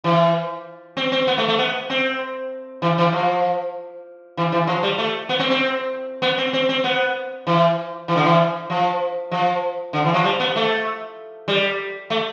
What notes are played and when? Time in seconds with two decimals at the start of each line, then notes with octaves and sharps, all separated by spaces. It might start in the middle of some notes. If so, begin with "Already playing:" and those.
0.04 E3
0.97 C4
1.12 C4
1.27 B3
1.38 A3
1.48 A3
1.58 B3
1.90 C4
2.82 E3
2.98 E3
3.13 F3
4.37 E3
4.52 E3
4.67 F3
4.83 G3
4.98 A3
5.29 B3
5.39 C4
5.50 C4
6.22 B3
6.38 C4
6.53 C4
6.69 C4
6.84 B3
7.47 E3
8.08 E3
8.16 D3
8.24 E3
8.70 F3
9.31 F3
9.93 D3
10.05 E3
10.14 F3
10.24 G3
10.40 B3
10.56 A3
11.48 G3
12.10 A3